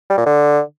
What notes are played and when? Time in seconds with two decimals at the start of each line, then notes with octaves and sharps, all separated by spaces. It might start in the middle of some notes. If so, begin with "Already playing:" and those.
0.10 G3
0.18 A#2
0.26 D3